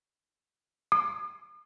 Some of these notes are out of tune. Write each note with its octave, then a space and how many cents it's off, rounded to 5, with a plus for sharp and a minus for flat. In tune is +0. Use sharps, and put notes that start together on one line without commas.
D#6 -45